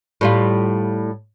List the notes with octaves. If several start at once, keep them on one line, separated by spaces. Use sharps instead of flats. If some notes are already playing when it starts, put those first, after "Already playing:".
A2 G3 F4